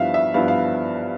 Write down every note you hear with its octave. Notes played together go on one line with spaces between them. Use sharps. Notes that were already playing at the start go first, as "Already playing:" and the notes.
Already playing: G2 F3 B3 E4 E5 F5
E5
G2 F3 B3 E4 F5
F5